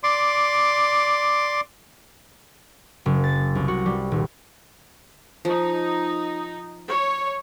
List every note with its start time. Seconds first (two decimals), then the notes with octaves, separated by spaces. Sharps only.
0.03 D5 C6 D6
3.06 F#1
3.24 A6
3.55 C2
3.68 F#4
3.86 G3
4.12 D#1
5.45 F3 D#4
6.88 C#5